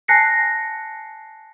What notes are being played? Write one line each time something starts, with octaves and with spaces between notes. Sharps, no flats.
G#5 A5 F#6 A#6 C7 C#7